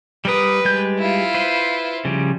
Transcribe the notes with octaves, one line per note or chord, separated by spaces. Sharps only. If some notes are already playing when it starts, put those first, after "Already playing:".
G3 A#4 B4 D#6
G3 G#3 G6
E4 F4
B4 C5
C#3 F3 G3